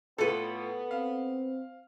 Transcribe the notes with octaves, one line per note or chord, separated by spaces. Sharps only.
A2 B3 F4 A4 B4
C4 F5